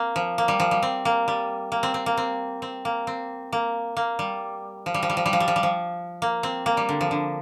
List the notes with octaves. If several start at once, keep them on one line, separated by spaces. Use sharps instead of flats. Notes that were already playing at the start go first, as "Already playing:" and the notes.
Already playing: A#3 C4
F3
A#3
G3
F3
G3
C4
A#3
G3
A#3
C4
C4
A#3
C4
C4
A#3
C4
A#3
A#3
G3
F3
G3
F3
G3
F3
G3
F3
G3
F3
G3
F3
A#3
C4
A#3
G3
D3
F3
D3